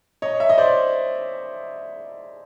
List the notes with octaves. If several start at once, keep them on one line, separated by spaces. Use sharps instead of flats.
C#5 D#5
E5
D#5
C5 D5